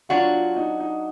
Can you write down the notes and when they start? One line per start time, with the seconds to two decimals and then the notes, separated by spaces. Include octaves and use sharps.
0.09 F#3 D4 F4 F#4
0.33 F4
0.56 D#4
0.80 D#4